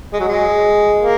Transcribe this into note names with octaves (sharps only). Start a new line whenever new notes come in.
G#3
F#3
G#3
A#3